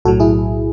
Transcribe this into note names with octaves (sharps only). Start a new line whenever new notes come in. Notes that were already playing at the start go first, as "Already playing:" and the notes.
B1 A2 F#3 F#4 A4
E4 G#4